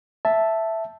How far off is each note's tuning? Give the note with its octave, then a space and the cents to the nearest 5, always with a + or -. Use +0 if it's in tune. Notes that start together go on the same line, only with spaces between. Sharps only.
E5 +0 A5 +0